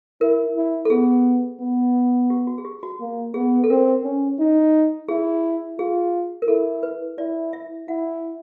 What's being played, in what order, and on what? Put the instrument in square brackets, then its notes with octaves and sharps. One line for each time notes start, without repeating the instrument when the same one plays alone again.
[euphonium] E4 [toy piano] A#4
[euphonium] E4
[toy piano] A4
[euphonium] B3 [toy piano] G#4
[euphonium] B3
[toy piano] G4
F#4
G#4
G4
F#4
[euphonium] A#3
[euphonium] B3 [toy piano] G#4
[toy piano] A4
[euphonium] C4 [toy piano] A#4
[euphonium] C#4
D#4
[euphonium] E4 [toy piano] G#4
[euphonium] F4 [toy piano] G#4
[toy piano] A#4
[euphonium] E4 [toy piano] A4
[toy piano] B4
[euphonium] E4 [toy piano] D5
[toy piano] E5
[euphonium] E4 [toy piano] F#5